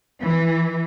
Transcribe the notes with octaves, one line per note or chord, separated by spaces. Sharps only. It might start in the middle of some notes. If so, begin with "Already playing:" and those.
E3